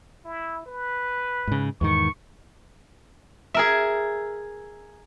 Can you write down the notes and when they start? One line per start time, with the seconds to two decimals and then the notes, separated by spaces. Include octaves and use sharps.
0.25 E4
0.66 B4
1.47 G#2 C#3
1.81 E2 G#2 D#3 C#6
3.54 G#4 A#4 E5